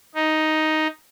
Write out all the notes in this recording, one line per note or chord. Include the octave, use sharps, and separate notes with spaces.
D#4